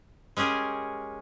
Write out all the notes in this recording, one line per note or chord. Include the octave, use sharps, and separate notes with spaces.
G#3 C#4 G4 G#4 A#4